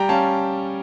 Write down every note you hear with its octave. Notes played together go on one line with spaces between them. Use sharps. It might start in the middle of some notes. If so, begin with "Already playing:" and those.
Already playing: G3 G5 A#5
C#4 F5 A5